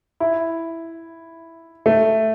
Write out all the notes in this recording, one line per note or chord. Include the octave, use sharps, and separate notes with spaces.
E4
A3